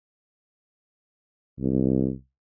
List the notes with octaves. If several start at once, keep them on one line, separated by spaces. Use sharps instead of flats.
C2